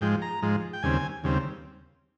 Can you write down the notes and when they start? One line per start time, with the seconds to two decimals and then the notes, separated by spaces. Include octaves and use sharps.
0.01 G#2 F3 G#3 G5
0.22 A#5
0.42 G#2 F3 G#3
0.73 G5
0.83 D#2 C#3 G3 C4 G#5
1.24 D#2 C#3 G3 C4